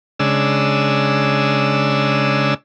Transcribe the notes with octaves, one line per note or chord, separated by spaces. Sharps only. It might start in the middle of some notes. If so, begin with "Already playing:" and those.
C#3 G#3 D4 E6